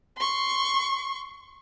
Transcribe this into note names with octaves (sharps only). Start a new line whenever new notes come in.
C6 C#6